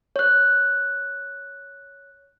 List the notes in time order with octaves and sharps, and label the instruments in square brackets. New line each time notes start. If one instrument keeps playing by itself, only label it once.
[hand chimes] C#5 F#6